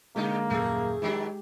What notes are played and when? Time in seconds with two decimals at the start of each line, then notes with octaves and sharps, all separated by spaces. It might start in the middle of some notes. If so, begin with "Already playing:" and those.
0.16 B2 D3 G#3 A#3 D#4
0.50 D#1 F#2 A3 G#4
1.02 D#3 F#3 G#3 D4 G4